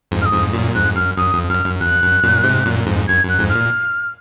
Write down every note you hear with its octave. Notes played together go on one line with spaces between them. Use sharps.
F2 G#2
F6
D#6
F2 G#2
F#2 A#2
F2 G#2 F#6
F#2 F6
F#2 D#6
F2
F#2 F6
F#2
F2 F#6
F#2
F#2 A#2
G#2 C3
F#2 A#2
F2 G#2
F#2 G#6
F#2
F#6
F2 G#2
F6
A#2